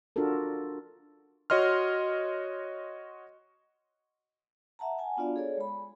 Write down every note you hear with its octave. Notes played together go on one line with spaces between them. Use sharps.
D4 F4 F#4 A4 A#4
F#4 C#5 D#5 C6 F6
E5 F#5 A5 A#5
F#5 G#5 A5
B3 D4 F4 F#4 D5 F5
G#4 A4 C#5 D5
G#3 B5